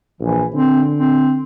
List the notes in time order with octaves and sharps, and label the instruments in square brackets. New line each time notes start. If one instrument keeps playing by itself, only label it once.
[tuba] A#1 [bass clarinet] E3
[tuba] D3 [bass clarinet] C4
[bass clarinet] C4